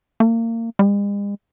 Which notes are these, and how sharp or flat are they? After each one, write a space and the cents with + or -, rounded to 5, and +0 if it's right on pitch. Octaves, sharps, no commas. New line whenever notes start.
A#3 -30
G#3 -45